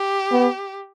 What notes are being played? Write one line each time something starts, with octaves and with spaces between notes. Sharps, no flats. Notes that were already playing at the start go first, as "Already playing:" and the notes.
Already playing: G4
B3